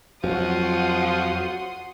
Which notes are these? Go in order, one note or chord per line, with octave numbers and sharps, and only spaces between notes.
F2 F3 F#3 F#4 F#5 C6 D#6